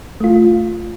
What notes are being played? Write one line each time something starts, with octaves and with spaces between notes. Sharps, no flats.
A3 F4